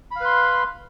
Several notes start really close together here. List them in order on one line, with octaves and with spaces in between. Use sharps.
B5 F5 B4 C6